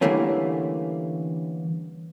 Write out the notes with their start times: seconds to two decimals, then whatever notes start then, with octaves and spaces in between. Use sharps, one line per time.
0.01 D3 E3 G3 A3 A#3 C#4